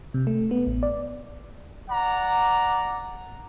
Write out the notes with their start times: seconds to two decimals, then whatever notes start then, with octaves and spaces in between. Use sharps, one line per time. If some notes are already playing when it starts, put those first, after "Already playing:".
0.14 C3
0.27 A3
0.51 B3
0.67 A1
0.83 D5
1.89 D5 F#5 A#5